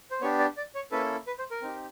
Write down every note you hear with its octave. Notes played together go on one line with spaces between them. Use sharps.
C5
B3 D4 G4 C#5
D5
D5
C#5
A#3 C#4 E4 A4 B4
B4
C5
A#4
C4 D#4 G4